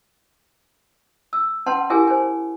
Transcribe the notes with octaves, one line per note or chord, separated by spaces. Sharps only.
E6
C#4 B4 F#5 A5 C6
E4 G4 G#4 A#4 G#5
C5 G#5